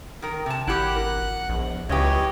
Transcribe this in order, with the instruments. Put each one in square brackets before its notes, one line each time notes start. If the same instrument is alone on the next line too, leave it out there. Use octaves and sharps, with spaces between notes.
[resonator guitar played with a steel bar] D#3 A#4
C3 A5
[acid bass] G#1 [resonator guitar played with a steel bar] E4 G4 [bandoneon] F#5 F#6
[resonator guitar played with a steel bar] A#4
[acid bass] A#1 [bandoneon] E2
[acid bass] C#2 [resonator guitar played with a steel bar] C#3 G4 [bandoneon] E3 C#5 D#5